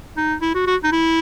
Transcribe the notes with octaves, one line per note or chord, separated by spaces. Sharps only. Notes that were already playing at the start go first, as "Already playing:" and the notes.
D#4
E4
F#4
F#4
D#4
E4